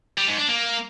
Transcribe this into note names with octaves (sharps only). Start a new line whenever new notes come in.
G3
G#2
D4
A#3